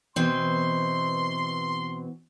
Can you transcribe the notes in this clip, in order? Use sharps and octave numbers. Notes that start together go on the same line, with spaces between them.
B2 E3 C4 C6